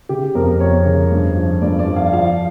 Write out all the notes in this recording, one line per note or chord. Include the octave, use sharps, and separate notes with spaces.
C#3 G4
F2 A#4
F2 C#5
C#3
G2
F3
G2 D5
D5
F3
F5
F3 F5